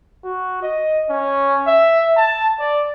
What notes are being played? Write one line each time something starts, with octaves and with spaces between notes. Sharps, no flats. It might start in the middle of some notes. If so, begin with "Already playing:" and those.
F#4
D#5
C#4
E5
A5
D5